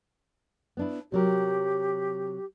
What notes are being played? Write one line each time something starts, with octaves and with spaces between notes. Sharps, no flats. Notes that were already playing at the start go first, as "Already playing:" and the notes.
B3 D4 E4
C3 F#3 G4 A#4